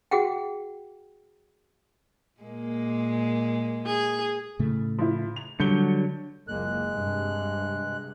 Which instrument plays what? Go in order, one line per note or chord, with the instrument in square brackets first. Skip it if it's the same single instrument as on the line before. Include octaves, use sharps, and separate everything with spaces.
[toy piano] F#4 G#4 F#5 G5
[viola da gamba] A#2 G#3 A#3
[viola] G#4
[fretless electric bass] A2 C#3 A3
[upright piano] F3 E4
F7
[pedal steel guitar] D3 F#3 [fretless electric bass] G3 [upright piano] G6 C#7 G7
[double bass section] F#1 C#2 A#3 [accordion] G#3 F#6
[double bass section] G2 C3